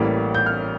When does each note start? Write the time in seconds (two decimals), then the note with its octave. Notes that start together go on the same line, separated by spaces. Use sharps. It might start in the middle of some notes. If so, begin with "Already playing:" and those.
Already playing: A1 A2 E3 G3 A#3
0.34 G6
0.46 F6